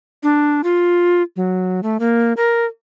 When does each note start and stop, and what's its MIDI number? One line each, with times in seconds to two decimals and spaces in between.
0.23 0.62 62
0.64 1.22 65
1.36 1.81 54
1.83 1.97 57
2.00 2.33 58
2.37 2.65 70